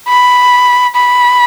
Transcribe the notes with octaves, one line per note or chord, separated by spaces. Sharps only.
B5
B5